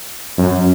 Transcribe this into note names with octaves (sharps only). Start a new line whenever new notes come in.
F#2